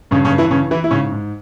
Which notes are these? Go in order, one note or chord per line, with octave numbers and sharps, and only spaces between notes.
G2 C#3 C#4
C#3 C#4
G2
E3 E4
C#3 E3 C#4
E3 E4
E4
G#2 C#3 C#4
G#2